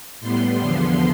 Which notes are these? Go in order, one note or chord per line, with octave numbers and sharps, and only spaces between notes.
A2 G3 B3 C6
E2 D3 F3 B3